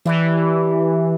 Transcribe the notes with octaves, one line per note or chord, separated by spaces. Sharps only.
E3 G3 D4 G4